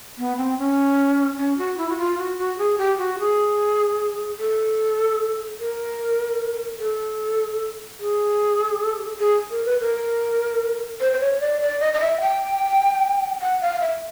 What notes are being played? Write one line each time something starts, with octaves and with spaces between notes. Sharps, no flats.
B3
C4
C#4
C#4
F#4
E4
F#4
F4
F#4
F#4
G#4
G4
F#4
G#4
A4
A#4
A4
G#4
G#4
A#4
B4
A#4
C5
C5
C#5
D5
D5
D#5
D#5
E5
G5
F#5
F5
E5